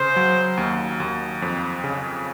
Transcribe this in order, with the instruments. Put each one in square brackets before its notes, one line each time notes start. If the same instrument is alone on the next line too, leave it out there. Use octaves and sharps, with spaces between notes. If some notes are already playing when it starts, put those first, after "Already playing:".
Already playing: [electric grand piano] C#3 [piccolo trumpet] C5
[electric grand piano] F#3
D#2
D#2
F2
C#3